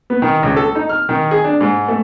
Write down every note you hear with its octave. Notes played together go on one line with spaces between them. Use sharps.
B3
D#3
C#2
A4
D#4
F6
D#3
G#4
D4
G#2
A3